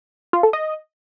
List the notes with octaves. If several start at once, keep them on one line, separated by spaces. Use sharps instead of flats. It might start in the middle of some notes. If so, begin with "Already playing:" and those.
F4
A4
D#5